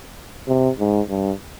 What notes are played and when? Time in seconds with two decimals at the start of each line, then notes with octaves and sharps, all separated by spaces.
0.48 C3
0.80 G#2
1.10 G2